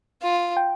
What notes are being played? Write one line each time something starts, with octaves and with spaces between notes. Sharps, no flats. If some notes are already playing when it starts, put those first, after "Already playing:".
F4
G5